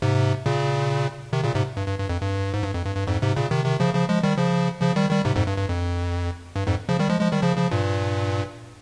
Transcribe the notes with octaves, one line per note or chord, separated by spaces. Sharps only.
G#2 C3
A#2 C#3
C3 D#3
A#2 C#3
G#2 C3
G2
G2
G2
F2
G2
G#2
G2
F2
G2
G2
F2 G#2
G#2 C3
A#2 C#3
C3 D#3
C3 D#3
C#3 F3
C#3 F3
F3 G#3
D#3 G3
C#3 F3
C#3 F3
D#3 G3
D#3 G3
G#2 C3
F2 G#2
G2
G2
F2
G2
F2 G#2
C#3 F3
D#3 G3
F3 G#3
F3 G#3
D#3 G3
C#3 F3
C#3 F3
G2 A#2